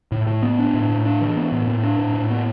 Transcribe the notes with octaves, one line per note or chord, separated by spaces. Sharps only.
A2
A2
B3
D4
A2
A2
D4
E3
B3
A2
A2
D4
A2
A2
B3